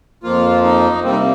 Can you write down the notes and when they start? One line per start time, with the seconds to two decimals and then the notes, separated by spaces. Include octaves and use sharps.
0.23 F2 F3 A#3 F4
0.64 D#4
1.03 C3 G3 A#3 C4
1.12 D#4
1.19 C4